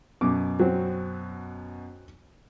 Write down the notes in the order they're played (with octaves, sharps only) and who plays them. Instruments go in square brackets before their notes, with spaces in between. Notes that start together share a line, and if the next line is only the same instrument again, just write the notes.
[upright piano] F#2 B2 [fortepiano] D6
[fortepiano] F#3 C4